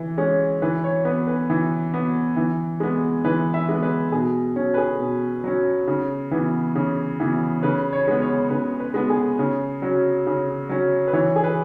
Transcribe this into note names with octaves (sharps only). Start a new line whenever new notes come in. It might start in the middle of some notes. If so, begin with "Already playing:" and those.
Already playing: E3
G#3 C#4
E3 B4
C#5
B3 B4
B4
E3
B3
E3
G#3 B3
E3 B4
E5
G#3 B3
B4
B2 G#4
F#3 C#4
B4
G#4
B2
F#3 C#4
C#3
E3 B3
C#3
E3 B3
C#3 B4
C#5
G#3 B3
C#5
C#3 B4
B4
G#3 B3
G#4
C#3
F#3 C#4
C#3
F#3 C#4
B4
E3 C#5
G#4
B4